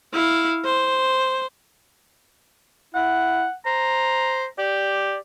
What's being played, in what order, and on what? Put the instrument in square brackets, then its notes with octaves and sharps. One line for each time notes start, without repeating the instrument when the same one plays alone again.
[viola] E4 F5
C5
[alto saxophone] E4 [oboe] F#5
[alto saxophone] C5 [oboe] A#5
[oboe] G4 [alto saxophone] D5